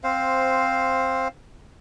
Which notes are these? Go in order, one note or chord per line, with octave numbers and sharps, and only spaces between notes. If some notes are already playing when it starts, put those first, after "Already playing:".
C4 C5 F5